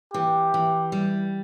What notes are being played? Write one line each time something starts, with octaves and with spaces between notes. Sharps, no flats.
E3 G4
E3
G3